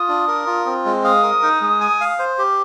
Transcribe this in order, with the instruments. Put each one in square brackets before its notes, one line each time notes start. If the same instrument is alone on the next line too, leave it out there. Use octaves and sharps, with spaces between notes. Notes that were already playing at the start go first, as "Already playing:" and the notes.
Already playing: [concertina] F4 [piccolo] D#6
[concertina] D4
A#4
F4
C4
G#3
[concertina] F5 [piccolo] D#6
[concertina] A#4
D#4
G#3
G#5
F5
C5
G4